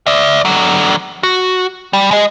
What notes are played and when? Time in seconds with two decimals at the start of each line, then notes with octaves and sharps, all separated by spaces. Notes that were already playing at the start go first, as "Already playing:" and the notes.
0.07 D5 E5
0.45 D3 F#3
1.23 F#4
1.93 G3
2.11 G#3 D#5